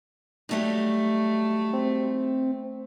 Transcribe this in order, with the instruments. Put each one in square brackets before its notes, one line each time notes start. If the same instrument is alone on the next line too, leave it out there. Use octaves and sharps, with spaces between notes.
[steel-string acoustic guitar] F#3 G3 D#4 [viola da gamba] A3
[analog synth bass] C4